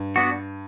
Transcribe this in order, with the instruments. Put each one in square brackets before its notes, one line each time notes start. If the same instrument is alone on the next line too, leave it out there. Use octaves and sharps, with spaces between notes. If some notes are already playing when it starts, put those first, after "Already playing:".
Already playing: [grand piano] G2
[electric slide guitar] B3 D4 F#4